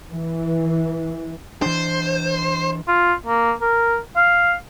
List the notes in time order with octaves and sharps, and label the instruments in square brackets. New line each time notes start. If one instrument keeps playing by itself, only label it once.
[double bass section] E3
[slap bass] E3 D4 [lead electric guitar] C5
[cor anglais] F4
A#3
A#4
F5